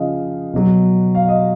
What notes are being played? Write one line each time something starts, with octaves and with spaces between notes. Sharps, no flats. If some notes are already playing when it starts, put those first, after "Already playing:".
Already playing: C#3 F3 D#5 F5
B2 F#3
F5
D#5